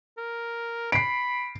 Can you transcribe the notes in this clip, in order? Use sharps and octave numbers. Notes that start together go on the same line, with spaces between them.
A#4
B5 C7 D7